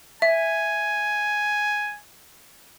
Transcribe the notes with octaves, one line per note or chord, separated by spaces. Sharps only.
E5 G#5